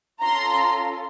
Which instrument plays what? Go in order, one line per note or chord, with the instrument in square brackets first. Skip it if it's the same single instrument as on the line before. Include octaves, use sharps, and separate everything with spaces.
[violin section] C#4 F4 A4 A#5 C6